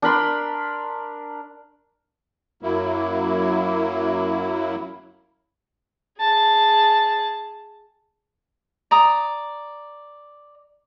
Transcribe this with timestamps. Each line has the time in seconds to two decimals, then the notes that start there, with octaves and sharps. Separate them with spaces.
0.02 D4 A#4 B5 C6
2.63 F#2 F#3 A#3 E4
6.20 G#4 A5
8.91 D5 A#5 D#6